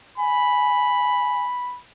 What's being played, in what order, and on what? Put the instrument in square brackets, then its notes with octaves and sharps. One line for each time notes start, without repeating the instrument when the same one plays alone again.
[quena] G#5 [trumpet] B5